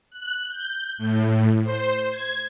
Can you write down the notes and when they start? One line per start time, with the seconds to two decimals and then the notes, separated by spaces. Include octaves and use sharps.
0.11 F#6
0.48 G6
0.98 A2
1.64 C5
2.11 G#6